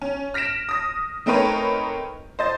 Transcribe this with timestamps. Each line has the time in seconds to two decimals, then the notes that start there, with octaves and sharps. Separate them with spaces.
0.02 C#4
0.34 F6 A#6 B6 D7 E7
0.69 D#6 A#6
1.26 A3 C4 D#4 A#4 B4 C#5
2.39 C5 D#5 A6